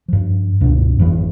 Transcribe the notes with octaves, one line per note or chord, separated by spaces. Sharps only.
G2 F3
C#2 G2 B2
G#1 F2 D#3 E3